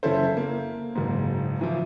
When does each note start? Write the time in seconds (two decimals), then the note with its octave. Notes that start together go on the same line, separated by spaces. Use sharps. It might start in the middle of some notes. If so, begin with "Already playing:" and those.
0.03 F#1 C#4 E4 A4 C5
0.37 A#3
0.95 F#1 G#2
1.61 E3 F3